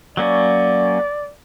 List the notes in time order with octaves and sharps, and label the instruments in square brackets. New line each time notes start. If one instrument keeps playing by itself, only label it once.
[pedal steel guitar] F#3 A#3 C#4 [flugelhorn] D5